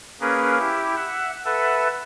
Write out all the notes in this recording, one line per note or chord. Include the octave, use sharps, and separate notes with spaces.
A#3 C#4 G#4 A#4 B4
E4 G4
E5 F#5
A4 B4 E5 F#5